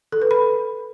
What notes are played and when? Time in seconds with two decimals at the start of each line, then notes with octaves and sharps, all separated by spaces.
0.12 A4
0.22 B4
0.31 B5